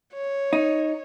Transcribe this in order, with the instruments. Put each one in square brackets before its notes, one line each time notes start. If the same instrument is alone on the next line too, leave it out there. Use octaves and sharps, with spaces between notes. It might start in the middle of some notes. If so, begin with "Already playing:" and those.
[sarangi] C#5
[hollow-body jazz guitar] D#4